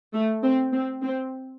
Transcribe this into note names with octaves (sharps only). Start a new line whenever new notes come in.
A3
C4
C4
C4